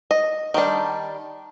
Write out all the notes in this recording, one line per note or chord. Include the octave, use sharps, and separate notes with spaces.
D#5
D#3 G3 D4